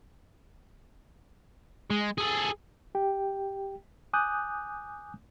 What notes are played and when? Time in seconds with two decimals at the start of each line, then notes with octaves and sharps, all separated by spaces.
1.91 G#3
2.18 G#4 A4
2.95 G4 G5
4.13 G#5 D6 D#6 F#6 G6